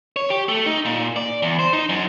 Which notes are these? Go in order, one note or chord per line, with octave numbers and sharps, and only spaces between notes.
C#5
G4
A3
D#4
A#2
D5
E2
C5
D#4
F#2